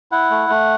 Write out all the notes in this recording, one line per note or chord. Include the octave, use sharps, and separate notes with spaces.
E4 F#5
A3
A3